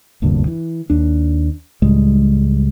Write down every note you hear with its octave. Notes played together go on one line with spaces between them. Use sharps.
F1 D2 G2 A#2
E3
D#2 D4
C#2 A2 G3 G#3